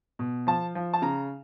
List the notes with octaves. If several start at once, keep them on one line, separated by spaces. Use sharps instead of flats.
B2
F3 A5
F3
A5
C#3 A#5